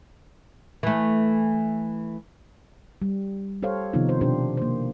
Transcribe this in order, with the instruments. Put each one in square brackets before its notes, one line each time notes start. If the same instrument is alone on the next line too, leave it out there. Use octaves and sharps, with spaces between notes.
[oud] E3 A3
[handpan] G3
G4 A4 C5 C#5 F5
C3 D#3 F3 B3 D#4 F4
C5
B2 D4 G4 C5
A#3 C5